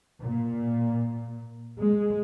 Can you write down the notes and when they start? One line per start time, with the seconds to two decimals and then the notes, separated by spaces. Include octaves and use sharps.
0.22 A#2
1.79 G#3